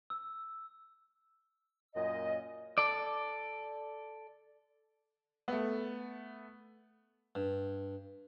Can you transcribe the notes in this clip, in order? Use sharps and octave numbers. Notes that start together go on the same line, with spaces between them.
E6
F#2 A#2 D#5
A4 D5
A3 B3
G2